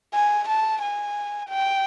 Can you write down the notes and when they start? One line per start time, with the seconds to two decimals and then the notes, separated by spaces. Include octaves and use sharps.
0.14 G#5
0.48 A5
0.82 G#5
1.50 G5